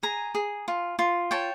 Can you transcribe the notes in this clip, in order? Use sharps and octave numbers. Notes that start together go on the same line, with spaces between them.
G#4 G#5 A#5
G#4
F4
F4
C#5 G5 A5